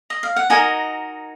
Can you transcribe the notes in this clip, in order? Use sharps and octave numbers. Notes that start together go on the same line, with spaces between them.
D#5
F5
F#5
D#4 F#4 A#4 D#5 G#5